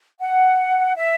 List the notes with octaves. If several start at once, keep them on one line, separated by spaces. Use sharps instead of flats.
F#5
E5